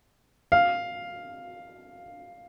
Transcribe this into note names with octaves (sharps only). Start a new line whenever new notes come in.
F5